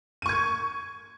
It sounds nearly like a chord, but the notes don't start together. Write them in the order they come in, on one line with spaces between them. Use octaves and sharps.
D#7 C#6 G#6